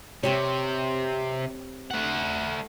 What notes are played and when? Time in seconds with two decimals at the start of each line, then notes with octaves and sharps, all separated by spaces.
0.23 C3 C4 G4 C#5
1.91 A3 F#5